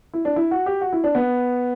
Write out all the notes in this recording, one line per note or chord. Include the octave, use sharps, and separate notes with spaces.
E4
D4
E4
F#4
G4
F#4
E4
D4
B3